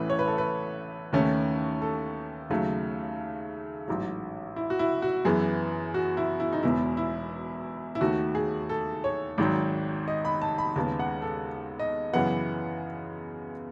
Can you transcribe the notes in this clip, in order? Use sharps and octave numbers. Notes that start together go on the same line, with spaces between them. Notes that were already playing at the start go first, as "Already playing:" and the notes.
Already playing: A1 A2 E3 A3 C#4 B4
C#5
B4
A4
B4
D#2 D#3 A3 C#4
A4
D#2 C#3 F#3 A3
A1 G#2 F#3
E4
F#4
E4
F#4
F#2 E3 B3 G#4
F#4
E4
E4
D#4
E1 E2 B2 E4
E4
E4
D#2 D#3 A3 F#4
G#4
A4
C#5
G#1 G#2 D#3 F#3
D#5
B5
A5
B5
D#2 C#3 G#3 B3 A5
F#5
A4
D#5
F#2 C#3 E3 B3 F#5